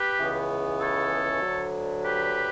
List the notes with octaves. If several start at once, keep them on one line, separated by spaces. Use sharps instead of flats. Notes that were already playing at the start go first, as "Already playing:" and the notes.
Already playing: G4 B4
C#2 C#3 E3 B3
A4 C#5
D2 D3 F#3
G4 B4